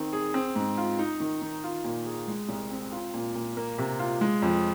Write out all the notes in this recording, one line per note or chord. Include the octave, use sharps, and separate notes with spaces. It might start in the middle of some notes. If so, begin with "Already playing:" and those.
Already playing: D#3 C4
G#4
C4
G#2
F4
D#4
D#3
D#3
F4
A#2
G#4
G#3
C2
C4
F4
A#2
A#2
A#3
C3
F4
G#3
F2